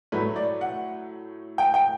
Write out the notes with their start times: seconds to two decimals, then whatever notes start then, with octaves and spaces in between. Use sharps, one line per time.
0.12 A2 F#3 A3 B4
0.36 D5
0.61 F#5
1.58 G5
1.74 G5